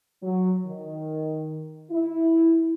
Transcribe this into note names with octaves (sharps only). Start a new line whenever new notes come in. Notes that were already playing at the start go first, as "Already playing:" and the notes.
F#3
D#3
E4